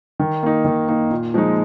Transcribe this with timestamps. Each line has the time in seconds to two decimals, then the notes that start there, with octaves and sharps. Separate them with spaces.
0.19 D#3
0.43 A#3 D#4
0.65 D#3
0.88 A#3 D#4
1.11 A#2
1.34 F3 G#3 D#4